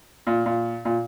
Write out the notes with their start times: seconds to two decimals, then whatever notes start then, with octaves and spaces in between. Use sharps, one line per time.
0.27 A#2
0.46 A#2
0.85 A#2